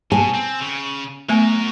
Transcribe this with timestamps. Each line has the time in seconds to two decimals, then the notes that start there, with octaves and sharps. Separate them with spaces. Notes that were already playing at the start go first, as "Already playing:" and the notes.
0.12 B2 G#5
0.35 C4
0.61 C#3
1.29 F#3 A3 B3 A#4 G#5